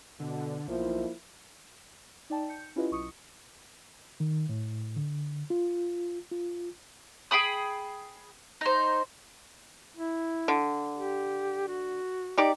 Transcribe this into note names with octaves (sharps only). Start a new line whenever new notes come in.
B2 D3
B1 F3 A#3 E4
D#4 D5 G5 A5
G6 C#7
C#4 E4 F4 G4 B4 D#5
B1 C#6 D#6 C#7
D#3
A2
D3
F4
F4
G#4 G5 B5 D#6
D#4 C5
E4
D3
G4
F#4
D#4 G4 D5